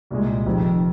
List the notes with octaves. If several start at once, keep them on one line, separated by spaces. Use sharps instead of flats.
C2 A#2 G#3
F1 F2 C3 D#3